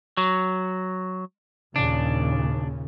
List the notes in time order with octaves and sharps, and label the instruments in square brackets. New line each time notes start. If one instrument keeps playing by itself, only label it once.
[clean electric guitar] F#3
[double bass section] D#2 A#2 C#3 [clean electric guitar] D4